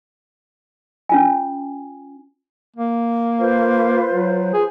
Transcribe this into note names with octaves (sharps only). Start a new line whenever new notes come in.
C#4 F4 G#5
A#3
F4 B4 C5
F#3
G#4